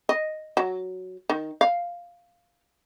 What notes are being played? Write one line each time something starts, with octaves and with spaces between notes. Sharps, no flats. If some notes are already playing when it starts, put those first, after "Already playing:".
D#5
F#3
D#3
F5